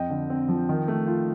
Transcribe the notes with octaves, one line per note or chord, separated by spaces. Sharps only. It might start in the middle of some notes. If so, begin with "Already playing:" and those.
Already playing: F2 D#5 G5
D3
C4
F3
D#3
A3
F4